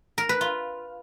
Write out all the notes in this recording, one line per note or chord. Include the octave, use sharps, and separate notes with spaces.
A#4
B4
F4